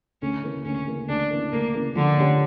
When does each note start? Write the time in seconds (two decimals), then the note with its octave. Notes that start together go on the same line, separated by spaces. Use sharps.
0.22 D2 C#4
0.44 C#3 E3 A#3
0.65 D2 C#4
0.87 C#3 E3 A#3
1.09 D2 D4
1.30 C#3 E3 A#3
1.52 D2 A#3
1.74 C#3 E3 A#3
1.96 D3 F3
2.17 C#4 G4 C#5